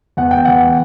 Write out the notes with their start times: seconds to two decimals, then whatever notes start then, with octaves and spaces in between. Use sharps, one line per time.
0.17 E2 F#5
0.31 G5
0.45 E2 F#5